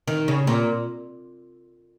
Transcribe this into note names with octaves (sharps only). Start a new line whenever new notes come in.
D#3
C#3
A#2